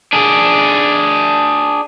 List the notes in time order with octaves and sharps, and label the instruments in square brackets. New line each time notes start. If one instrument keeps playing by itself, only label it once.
[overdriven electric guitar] D4 G#4